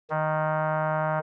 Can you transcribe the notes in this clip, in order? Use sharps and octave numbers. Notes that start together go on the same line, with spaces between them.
D#3